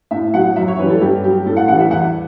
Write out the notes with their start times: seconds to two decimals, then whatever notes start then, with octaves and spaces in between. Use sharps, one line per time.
0.11 A2 E5
0.34 F#3 F#5
0.56 F#2 E5
0.68 C#5
0.78 E3 B4
0.82 G3
0.90 A4
1.01 G2 G4
1.24 F#3 G4
1.46 A2 A4
1.57 F#5
1.68 E3 G3 F#5
1.80 E5
1.91 E2 F#5